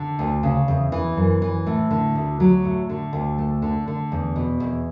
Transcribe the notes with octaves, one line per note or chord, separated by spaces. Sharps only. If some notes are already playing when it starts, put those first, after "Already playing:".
Already playing: D3
D2
C#3
E2
E3
F#2
E3
A2
D3
D2
F#3
A2
D3
D2
A3
D3
D3
E2
B2
E2